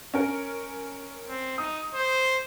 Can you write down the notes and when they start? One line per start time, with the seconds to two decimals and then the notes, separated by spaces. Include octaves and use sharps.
0.14 C#4 A#4
1.28 C4
1.58 D#4 D#6
1.94 C5